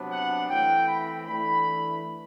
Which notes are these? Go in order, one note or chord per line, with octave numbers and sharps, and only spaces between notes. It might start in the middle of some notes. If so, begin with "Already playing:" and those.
Already playing: C3 F#3 B3 D4
F#5
E3 A3 C4 G5
B5
E3 A3 D4 B5